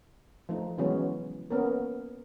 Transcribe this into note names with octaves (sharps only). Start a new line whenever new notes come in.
F3 A3 D#4
C#3 E3 F#3 G#3 B3 C#4
A#3 B3 C#4 A#4